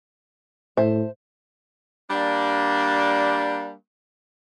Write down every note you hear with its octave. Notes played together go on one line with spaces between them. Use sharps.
A2 C5 E5 A5
G3 A#3 D4